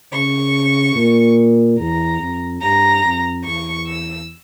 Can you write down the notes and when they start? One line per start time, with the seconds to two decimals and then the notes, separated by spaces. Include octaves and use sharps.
0.13 C#3 C#6
0.95 A#2
1.79 E2 A#5
2.20 F2
2.62 G2 A#5
3.04 F2
3.45 E2 C#6
3.87 E6